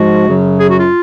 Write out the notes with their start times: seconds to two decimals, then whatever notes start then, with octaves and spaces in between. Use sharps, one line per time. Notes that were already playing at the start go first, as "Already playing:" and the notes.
Already playing: G#2 F3 G#3 F#4
0.27 F#2 C#3 F#3
0.58 G#4
0.67 F#4
0.78 F4